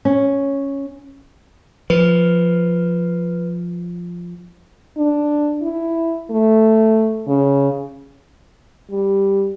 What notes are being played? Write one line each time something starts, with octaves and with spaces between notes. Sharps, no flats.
C#4
F3 B4
D4
E4
A3
C#3
G3